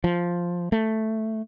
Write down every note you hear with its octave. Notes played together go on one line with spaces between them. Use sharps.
F3
A3